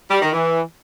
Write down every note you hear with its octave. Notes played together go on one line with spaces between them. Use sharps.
G3
D#3
E3